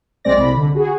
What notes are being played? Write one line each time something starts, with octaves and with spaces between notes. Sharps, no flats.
A#1 G#3 C4 D5 A#6
C2 B5
D3
F#4 G#4